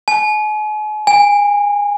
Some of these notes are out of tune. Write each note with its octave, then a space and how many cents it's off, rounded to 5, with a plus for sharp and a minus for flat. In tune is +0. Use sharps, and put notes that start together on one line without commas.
G#5 +40
G#5 -25